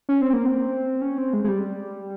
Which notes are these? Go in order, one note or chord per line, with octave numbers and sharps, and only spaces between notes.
C#4
C4
A#3
C4
C#4
C4
G#3
G#3
G3